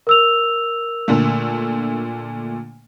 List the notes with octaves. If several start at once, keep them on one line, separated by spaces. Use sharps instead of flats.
A#4 E6 F7
A#2 D3 A3